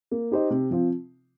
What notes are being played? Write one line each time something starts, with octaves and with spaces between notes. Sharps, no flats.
A#3
D#4 G4 C5 D#5
C3
F3 C4 F4